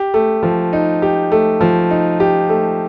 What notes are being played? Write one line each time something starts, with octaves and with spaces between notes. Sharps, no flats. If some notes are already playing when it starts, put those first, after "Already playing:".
Already playing: G4
A3
F3
D#4
G4
A3
F3
D#4
G4
A3